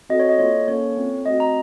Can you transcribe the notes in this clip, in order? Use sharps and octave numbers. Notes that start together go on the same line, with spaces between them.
C4 F#4 A4 D#5
C#5
D#5
A#3 F4 A4 C#5
A#3 C#4 A4 C#5
C4 F4 A4
A3 C4 F#4 D#5
A#5